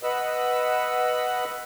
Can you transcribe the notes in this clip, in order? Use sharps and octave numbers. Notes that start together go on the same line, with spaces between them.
B4 D#5 F#5 B5 E6